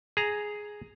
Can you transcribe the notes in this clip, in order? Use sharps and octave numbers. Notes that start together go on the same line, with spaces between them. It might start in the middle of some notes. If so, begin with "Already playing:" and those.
G#4 A#5